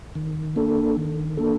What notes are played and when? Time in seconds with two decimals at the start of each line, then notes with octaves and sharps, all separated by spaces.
0.15 D#3
0.56 A#3 D4 A4
0.97 D#3
1.37 A#3 D4 A4